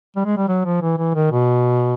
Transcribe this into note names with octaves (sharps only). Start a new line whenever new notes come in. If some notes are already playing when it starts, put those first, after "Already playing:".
G3
G#3
G3
F#3
F3
E3
E3
D#3
B2